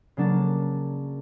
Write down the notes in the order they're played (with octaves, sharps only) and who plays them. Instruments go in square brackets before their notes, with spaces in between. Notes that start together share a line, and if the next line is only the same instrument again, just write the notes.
[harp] C#3 F#3 A#3 D4